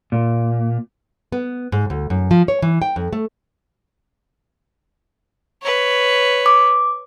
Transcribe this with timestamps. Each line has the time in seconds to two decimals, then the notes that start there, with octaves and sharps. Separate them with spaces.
0.12 A#2
1.32 B3
1.72 G#2
1.90 D2
2.10 F#2
2.31 F3
2.48 C#5
2.62 E3
2.82 G5
2.96 F2
3.13 A3
5.62 B4 C#5
6.46 D6